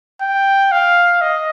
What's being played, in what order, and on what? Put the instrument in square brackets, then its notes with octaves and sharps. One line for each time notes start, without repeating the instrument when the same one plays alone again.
[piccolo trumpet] G5
F5
D#5